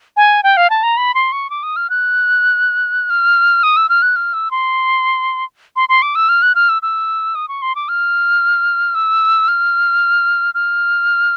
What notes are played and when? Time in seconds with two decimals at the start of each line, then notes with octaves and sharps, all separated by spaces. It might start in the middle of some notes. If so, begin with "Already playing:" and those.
0.17 G#5
0.43 G5
0.57 F5
0.70 A5
0.83 A#5
0.97 B5
1.14 C6
1.32 C#6
1.50 D6
1.63 D#6
1.76 F6
1.90 F#6
3.10 F6
3.63 D#6
3.77 E6
3.89 F6
4.02 F#6
4.16 F6
4.33 E6
4.51 C6
5.76 C6
5.89 C6
6.02 D6
6.15 E6
6.29 F6
6.42 F#6
6.55 F6
6.69 E6
6.82 E6
7.35 D#6
7.49 C#6
7.62 C6
7.75 D6
7.89 F6
8.95 E6
9.48 F6
10.54 F6